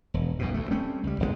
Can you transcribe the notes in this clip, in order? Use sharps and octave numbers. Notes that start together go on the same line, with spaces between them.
E1
B1 F#2 B2
D2 A3
G3 A3 C4 C#4
C#2 G3
F1 B1 A#2 G#3